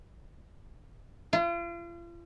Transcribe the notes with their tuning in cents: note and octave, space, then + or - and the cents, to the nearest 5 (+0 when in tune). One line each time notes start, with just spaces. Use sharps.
F4 -40